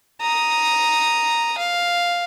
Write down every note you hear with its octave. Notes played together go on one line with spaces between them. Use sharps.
A#5 D#6
F5